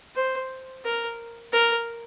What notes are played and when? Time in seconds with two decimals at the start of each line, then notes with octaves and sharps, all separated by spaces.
0.15 C5
0.84 A#4
1.52 A#4